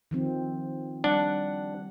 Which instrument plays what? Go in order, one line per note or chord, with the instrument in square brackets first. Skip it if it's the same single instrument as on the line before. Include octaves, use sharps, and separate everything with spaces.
[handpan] D#3 F3 C4
[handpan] G3 F#5 [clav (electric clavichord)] D4